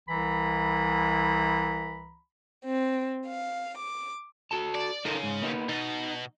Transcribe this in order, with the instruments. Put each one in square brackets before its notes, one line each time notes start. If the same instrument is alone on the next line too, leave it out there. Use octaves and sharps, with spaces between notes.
[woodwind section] C2 E3 A#5 B5
[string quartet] C4
F5
D6
[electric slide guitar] F#4 A4 A5
[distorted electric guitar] D5
[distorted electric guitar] C#3 [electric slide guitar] D#4 A4 A#4
[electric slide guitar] G#2
A#3 B3 D#4
[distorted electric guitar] B2 [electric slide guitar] D#4